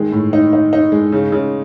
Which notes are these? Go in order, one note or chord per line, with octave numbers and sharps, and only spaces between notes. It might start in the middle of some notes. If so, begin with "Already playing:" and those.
Already playing: D#3 G#3
A2
D#4
D#4
D#4
G#3
C#3
C#3